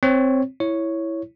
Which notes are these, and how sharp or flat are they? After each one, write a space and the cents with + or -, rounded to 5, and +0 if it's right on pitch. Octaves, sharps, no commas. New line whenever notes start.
C4 +0 C#5 +0
E4 +0 C#5 +0